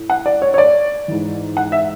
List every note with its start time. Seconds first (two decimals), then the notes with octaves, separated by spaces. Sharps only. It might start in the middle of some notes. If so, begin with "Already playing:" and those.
Already playing: A2
0.10 F#5
0.26 D5
0.42 C#5
0.54 C#5
0.58 D5
1.08 G#2 E3
1.57 F#5
1.72 E5